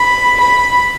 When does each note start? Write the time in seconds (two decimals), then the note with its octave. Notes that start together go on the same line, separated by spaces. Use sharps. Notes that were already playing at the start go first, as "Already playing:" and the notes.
Already playing: B5
0.40 B5